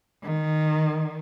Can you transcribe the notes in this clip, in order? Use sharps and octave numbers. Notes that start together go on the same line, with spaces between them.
D#3